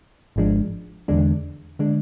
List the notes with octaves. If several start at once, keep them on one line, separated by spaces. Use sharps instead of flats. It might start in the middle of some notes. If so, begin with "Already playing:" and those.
G#1 G#2 F3 G#3 D4
E2 D3 G#3 D4
D3 G#3 D4